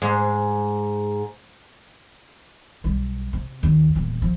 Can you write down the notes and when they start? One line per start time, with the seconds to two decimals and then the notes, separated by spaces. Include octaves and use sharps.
0.02 G#2
2.84 B1 G3
3.33 C3
3.63 D#2
3.95 D#1 E2
4.22 F3